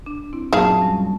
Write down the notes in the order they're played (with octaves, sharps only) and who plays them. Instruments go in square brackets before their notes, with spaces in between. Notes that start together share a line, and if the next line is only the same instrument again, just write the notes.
[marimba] D4
C4 E4
[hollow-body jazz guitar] F#2 A#2 [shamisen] D#4 G#4 F5 [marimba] E5 [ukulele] A5
[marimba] G3 C#4